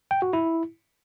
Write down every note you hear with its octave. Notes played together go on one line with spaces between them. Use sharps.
G5
F#4
E4